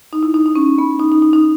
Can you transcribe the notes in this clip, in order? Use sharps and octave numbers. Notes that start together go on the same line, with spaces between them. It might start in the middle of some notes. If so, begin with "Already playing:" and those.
D#4
E4
D#4
D#4
C#4
B3
D#4
D#4
D#4
D#4